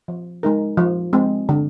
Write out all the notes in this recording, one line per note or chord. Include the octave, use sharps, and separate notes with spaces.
F3
G#3 D#4 A#4
F3
G#3 C4
D3